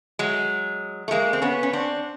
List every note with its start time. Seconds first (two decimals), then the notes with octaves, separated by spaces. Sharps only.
0.19 F#3 G#3
1.08 A3
1.11 G#3 A#3
1.33 C4
1.42 B3 C#4
1.63 C#4
1.73 C4 D4